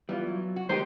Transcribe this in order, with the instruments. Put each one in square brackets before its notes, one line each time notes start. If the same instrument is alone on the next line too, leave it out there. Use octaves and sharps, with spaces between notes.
[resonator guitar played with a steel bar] E3 [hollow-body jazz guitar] G3 B3 F4
[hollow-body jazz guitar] F#3
[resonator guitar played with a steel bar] F#4
[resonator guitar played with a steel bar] D#3 D#4 G4 [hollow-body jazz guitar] G#3 B3 [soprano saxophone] C5